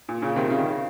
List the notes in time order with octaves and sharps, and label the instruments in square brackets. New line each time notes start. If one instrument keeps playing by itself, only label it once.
[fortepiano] A#2
A#2 C#3
C3 D#3
C#3
D#3
C#3